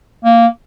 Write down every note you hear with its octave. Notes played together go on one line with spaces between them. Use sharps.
A#3